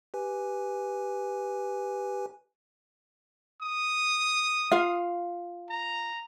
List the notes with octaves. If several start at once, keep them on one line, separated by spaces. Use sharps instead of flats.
G4 B4 G#5
D#6
F4 F5
A#5